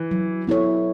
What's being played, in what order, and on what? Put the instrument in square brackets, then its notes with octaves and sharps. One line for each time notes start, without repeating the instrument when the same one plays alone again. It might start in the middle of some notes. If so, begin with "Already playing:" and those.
Already playing: [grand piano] E3
[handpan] F#3
B3 E4 A4 C#5